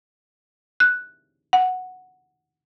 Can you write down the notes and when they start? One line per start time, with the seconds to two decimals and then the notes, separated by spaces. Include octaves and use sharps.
0.80 F#6
1.53 F#5